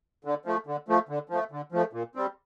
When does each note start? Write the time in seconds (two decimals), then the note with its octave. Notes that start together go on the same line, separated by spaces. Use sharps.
0.25 D3
0.45 F3 A3
0.67 D3
0.88 F3 A3
1.09 D3
1.29 F3 A3
1.52 D3
1.72 F3 A3
1.93 A#2
2.15 G3 C4